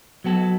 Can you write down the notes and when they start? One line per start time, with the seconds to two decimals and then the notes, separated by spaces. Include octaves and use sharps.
0.24 F#3 B3 F#4 A4